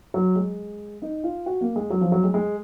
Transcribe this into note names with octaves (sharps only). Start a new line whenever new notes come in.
F#3
G#3
D#4
F4
F#4
A#3
G#3
F#3
F3
F#3
G#3
G#3